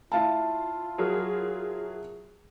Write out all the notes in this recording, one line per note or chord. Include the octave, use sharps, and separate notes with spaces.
E4 F4 F5 A5
F#3 G#4 A#4